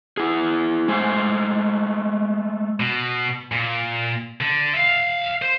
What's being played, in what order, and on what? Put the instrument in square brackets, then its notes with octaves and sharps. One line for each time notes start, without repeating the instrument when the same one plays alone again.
[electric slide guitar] E4 G#4
G#3 A3 C5 G#5
[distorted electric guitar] B2
A#2
D3
E5 F5
C5